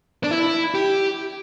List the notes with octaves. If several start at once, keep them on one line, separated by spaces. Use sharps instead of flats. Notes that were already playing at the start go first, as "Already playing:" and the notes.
D4
E4
G4